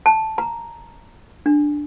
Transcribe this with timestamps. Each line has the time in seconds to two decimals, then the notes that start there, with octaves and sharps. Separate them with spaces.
0.06 A5
0.38 A#5
1.46 D4